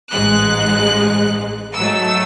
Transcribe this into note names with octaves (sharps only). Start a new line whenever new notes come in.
A1 G#2 G#3 F#6
G#2 F#3 A3 E6